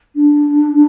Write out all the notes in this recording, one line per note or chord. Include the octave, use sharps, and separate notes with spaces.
D4